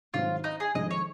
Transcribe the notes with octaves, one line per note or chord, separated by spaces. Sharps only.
G#2 D#3 F#3 C4 F4
D#4
G#4
F2 D#3 G#3 D#5
C#5